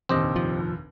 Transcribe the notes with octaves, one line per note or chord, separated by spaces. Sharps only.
F1 A#1 D#2 C4 G4 D#5
F3